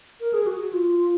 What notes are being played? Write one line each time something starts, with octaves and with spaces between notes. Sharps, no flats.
A#4
G#4
F#4
F#4
F4